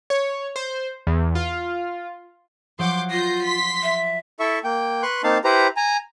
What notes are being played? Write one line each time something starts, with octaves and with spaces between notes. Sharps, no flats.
C#5
C5
E2
F4
F3 F#3 F#5 C6 D6 G6
F4 G6 A#6 C7
C6 B6
E5
E4 A4 E5 C#6
A#3 G5
B4 C6 C#6 F#6
A#3 C4 D#4 F5 A5
E4 G4 B4 C5 A#5
G#5 A#5